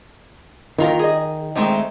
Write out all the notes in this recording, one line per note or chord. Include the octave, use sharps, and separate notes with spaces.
D#3 A#3 F4 A#4
G#4 D#5
D#3 G#3 A3 C4 D#4